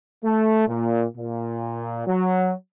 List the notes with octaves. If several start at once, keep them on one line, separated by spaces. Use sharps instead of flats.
A3
A#2
A#2
F#3